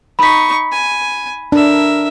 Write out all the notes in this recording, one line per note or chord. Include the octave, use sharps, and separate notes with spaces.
D#4 B5 C#6 B6
G#5
D4 A#4 E5